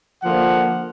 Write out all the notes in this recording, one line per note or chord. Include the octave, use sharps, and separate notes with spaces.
D3 F3 A#3 F#5